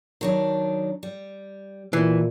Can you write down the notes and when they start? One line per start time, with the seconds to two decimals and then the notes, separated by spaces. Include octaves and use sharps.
0.21 D#3 F#3 D4
1.03 G3
1.93 A#2 E3